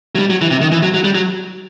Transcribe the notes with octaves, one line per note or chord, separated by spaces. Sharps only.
F#3
G3
F#3
E3
C3
D#3
E3
F#3
F#3
G3
F#3